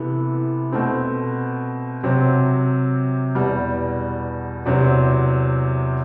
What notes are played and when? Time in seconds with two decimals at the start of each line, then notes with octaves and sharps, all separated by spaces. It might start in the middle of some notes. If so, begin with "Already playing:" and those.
Already playing: C3 E3 B3 E4 A4
0.72 B2 A3 C4
2.03 C3 F#3 C4 G4
3.35 E2 B2 G3
4.66 E2 C3 F#3 C4